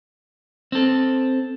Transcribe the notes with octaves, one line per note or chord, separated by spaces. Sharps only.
C4 A4